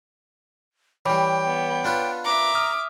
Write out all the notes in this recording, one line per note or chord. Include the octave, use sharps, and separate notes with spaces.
E3 G3 C#5 G5 B5 D6
B3
D4 F4 B4
E5 A#5 D6
D#6 F6